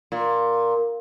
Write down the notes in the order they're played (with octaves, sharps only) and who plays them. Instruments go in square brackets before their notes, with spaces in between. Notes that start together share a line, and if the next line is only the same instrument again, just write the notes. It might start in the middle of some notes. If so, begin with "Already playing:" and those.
[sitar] A#2